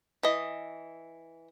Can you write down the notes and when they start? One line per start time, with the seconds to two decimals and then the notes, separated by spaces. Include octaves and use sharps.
0.23 E3 D#5